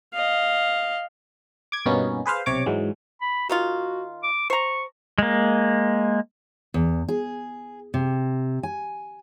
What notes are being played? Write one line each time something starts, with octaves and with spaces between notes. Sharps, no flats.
D#5 F5
D6 G#6
G2 B2 A#3 B3 C#4 D#4
G#4 B4 C5 F5
B1 C3 C#5 D6
G#2 E3 F#3 G#3
B5
D#3 D#4 F4 F#4
D6
C5 A#5 C#6
G#3 A#3
E2
G#4
C3
G#5